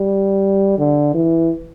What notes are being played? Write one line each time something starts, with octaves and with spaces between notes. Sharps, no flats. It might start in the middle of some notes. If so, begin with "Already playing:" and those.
Already playing: G3
D3
E3